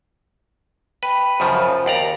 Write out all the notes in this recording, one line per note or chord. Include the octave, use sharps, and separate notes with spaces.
B4 G5 B5
F#2 C#3 F3 C5
D#2 D5 A#5